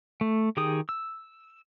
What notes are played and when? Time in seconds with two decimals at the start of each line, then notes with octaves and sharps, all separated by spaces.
0.21 A3
0.57 D#3 G4 G#4 G5 D#6
0.89 E6